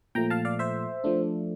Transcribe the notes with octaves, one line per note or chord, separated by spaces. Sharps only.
A#2 F3 A3 G5 A#5
F5 A5
D5 F5
C5 E5
F3 A3 D4